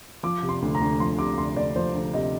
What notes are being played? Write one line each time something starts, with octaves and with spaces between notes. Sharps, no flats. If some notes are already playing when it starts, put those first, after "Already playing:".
F3 D6
C3
C6
D2
A#5
D2
F3 C6
C3 D6
D2 C6
D2 D5
F3 C5
D2
C3 D#5